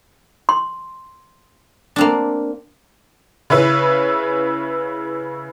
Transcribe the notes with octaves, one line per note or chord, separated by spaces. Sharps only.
C6
A#3 C4 D4
C#3 C#4 E4 B4